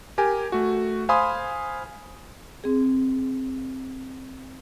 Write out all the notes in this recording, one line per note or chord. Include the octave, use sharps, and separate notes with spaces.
G4 A#4 G#5
A3 F#4
C5 F5 G#5 B5 C6 D#6
C4 G#4